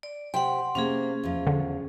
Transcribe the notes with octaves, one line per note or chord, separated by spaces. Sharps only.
D5
C3 F#5 G5 C6
C3 A#3 C#4 G#4
E2 F3
D3